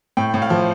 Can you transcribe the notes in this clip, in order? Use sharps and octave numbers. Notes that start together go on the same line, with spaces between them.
A2 G5
A2
F5
F3